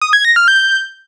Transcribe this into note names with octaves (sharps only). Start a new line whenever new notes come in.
D#6
G#6
A#6
F6
G6